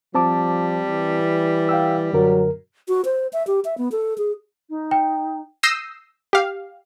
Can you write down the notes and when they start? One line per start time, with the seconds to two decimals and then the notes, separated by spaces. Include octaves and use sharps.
0.15 F3 G3 C4 A5 D6
0.89 E3
1.69 F5 G5 E6
2.13 F#2 D3 F#3 A#4
2.88 F#4
3.05 C5
3.33 E5
3.47 G4
3.65 E5
3.78 B3
3.92 A4
4.18 G#4
4.70 D#4
4.91 G5
5.63 D#6 E6 G6 A#6 C7 D#7
6.33 G4 F5